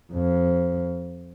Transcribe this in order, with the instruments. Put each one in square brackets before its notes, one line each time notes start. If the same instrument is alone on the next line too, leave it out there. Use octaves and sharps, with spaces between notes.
[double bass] F2